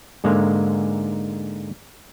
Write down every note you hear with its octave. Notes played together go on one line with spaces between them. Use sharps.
G#2 D3 G#3 A#3